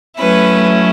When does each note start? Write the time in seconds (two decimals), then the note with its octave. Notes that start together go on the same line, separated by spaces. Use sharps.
0.17 F#3 A3 C#4 E4 B4